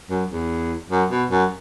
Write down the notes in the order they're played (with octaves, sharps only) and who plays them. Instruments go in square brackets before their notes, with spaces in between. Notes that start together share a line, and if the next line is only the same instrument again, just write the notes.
[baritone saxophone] F#2
E2
F#2
B2
F#2